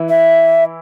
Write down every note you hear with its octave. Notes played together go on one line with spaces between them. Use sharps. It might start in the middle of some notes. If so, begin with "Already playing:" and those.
Already playing: E3 E4
E5